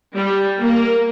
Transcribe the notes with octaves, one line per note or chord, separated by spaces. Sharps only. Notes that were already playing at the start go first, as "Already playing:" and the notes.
G3
A#3